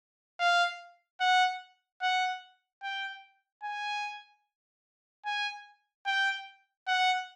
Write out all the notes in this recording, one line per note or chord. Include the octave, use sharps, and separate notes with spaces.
F5
F#5
F#5
G5
G#5
G#5
G5
F#5